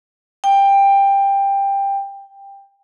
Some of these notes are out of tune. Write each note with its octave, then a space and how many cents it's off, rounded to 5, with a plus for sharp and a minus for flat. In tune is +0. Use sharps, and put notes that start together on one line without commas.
G5 +15